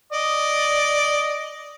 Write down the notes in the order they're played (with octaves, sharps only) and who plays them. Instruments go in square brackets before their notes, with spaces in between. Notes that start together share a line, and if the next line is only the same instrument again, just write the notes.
[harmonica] D5 D#5